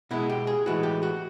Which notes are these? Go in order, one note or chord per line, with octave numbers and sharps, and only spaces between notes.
B2 G#3 E4
G4
G#4
A2 E3 G#3 F#4
G4
F#4